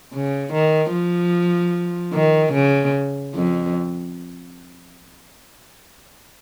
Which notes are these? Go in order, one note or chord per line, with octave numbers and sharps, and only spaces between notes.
C#3
D#3
F3
D#3
C#3
F2